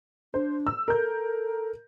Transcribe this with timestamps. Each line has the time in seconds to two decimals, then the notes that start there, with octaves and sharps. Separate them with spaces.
0.34 D4 C5
0.67 E6
0.88 A4 A#4 G6